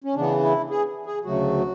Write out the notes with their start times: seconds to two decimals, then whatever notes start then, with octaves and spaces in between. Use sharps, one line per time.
0.04 C#4
0.15 C#3 E3 B3 D4
0.43 E4
0.70 G#4
1.06 G#4
1.24 D2 C#3 F#3 A3 F#4